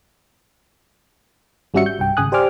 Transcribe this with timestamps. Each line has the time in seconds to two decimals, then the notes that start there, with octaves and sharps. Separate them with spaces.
1.74 G#1 G3 C#4 F#4 E5 C#7
1.86 G6
1.99 C2 G2 G5
2.17 G#1 C#3 G#5 D#6 F#6
2.32 G4 C5 D5 G#5 D6 F6